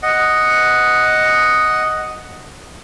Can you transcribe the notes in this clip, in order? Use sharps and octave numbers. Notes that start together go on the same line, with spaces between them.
D#5 F#5